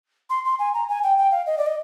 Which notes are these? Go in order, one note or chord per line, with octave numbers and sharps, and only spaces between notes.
C6
C6
G#5
A#5
G#5
G5
G5
F5
D#5
D5
D#5